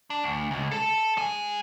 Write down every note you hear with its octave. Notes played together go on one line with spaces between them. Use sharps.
D4
D2
C#2
A4 A5
G#3 G#5